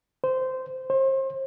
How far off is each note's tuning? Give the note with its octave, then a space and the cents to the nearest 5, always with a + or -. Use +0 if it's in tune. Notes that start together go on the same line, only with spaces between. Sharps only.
C5 -15
C5 +35